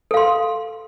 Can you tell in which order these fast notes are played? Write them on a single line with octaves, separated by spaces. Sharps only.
A4 F5 C6